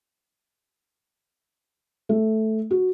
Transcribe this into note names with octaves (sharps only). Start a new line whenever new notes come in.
A3
F#4